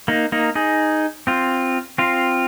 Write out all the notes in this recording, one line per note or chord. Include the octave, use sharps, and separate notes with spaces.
A#3 D#4
A#3 D#4
D#4 G#4
C4 F4
C4 F4